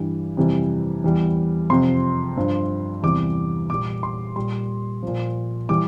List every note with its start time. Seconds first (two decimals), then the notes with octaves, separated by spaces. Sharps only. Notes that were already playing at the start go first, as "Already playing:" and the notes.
Already playing: G2 E3 G3
0.37 F2 C3 E3 G3
1.04 E2 E3 G3
1.70 F2 C3 F3 C6
2.37 G2 F3
3.02 E2 C3 E3 G3 D6
3.70 A#2 G3 D6
4.03 C6
4.36 A#2 G3 C6
5.03 A#2 F3
5.69 E3 G3 D6